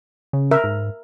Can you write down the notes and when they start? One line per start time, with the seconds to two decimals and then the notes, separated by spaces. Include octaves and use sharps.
0.33 C#3
0.51 A#4 E5
0.64 G#2